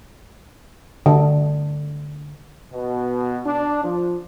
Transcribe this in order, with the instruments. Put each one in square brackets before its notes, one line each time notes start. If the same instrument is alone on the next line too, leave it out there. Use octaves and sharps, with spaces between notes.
[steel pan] D3
[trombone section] B2
D4
F3